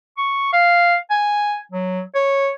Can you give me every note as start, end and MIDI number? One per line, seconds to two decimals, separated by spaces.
0.17 0.51 85
0.53 0.97 77
1.10 1.58 80
1.72 2.01 54
2.15 2.51 73